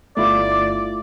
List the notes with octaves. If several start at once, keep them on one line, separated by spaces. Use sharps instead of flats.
G1 A3 E4 F4 D5